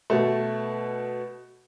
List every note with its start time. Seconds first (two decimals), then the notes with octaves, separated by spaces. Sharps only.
0.10 B2 A3